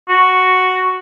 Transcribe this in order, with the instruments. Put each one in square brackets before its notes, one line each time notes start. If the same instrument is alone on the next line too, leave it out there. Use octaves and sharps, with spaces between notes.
[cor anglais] F#4